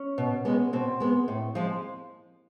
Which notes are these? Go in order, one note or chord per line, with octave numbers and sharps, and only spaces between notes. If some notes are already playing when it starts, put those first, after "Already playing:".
Already playing: C#4
B2
G#3 B3
B2 C4
G#3 B3
A2
F3 G#3